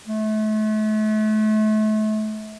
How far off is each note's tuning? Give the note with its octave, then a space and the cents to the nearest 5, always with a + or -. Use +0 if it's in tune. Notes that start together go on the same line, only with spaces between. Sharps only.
A3 -35